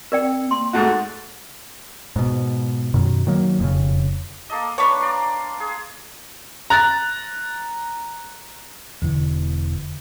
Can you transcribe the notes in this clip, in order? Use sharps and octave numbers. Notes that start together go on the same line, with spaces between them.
C4 A#4 D5 G5
A#3 C6
G#2 A3 F#4
G#2 B2
F#2 B2 D#3
D#3 F#3 A#3
E1 F2 C#3
A#3 A4 D#5
D4 B4 C#5
D5 A#5 C6
G#4
A#5 F#6 A6
E1 E2 D3 E3